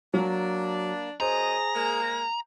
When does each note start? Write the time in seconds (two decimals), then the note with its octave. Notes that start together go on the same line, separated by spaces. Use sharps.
0.14 F#3 A#3 D4
1.20 F#2 G#4 C5 D#5 A#5
1.75 G#3 A#3